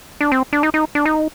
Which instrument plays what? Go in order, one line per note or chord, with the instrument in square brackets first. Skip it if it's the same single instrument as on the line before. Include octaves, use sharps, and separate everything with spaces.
[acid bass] D4
C4
D4
D#4
D#4
D4
D#4